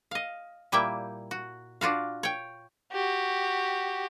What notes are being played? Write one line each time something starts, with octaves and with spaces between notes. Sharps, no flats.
D#5 F5
A#2 G3 A#3 E4 E5 G5
F#4
D4 F4 F#4 F5
C#5 G5
F#4 G4